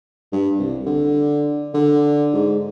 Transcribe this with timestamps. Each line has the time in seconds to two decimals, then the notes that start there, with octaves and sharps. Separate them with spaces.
0.32 G2
0.59 C2
0.86 D3
1.74 D3
2.34 G#2